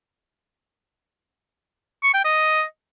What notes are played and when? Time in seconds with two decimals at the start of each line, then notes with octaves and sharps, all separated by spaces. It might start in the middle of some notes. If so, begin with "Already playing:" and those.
2.03 C#6
2.14 G5
2.24 D#5